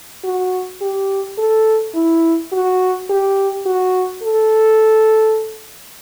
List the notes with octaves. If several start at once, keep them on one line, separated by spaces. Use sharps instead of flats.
F#4
G4
A4
E4
F#4
G4
F#4
A4